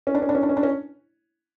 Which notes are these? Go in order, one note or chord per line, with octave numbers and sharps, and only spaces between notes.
C#4
D4
C#4
D4
C#4
D4
C#4
D4
C#4